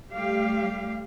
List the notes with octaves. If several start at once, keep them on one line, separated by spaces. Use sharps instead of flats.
G3 A3 G4 F5